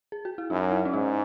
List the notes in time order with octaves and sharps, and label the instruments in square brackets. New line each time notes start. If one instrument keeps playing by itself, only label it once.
[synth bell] G#4
F#4
E4
[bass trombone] F#2 [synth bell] D#4
[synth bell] E4
C#4
[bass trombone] G#2 [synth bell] D#4